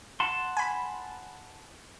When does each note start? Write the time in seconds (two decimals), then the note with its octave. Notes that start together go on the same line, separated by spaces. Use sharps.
0.20 F#5 A5 C6
0.57 G#5 B5